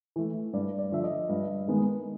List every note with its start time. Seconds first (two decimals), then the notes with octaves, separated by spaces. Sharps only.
0.16 E3 A3
0.53 G2 D5
0.79 D5
0.92 D3 F3 E5
1.04 D#5
1.29 G2
1.68 D#3 G#3 B3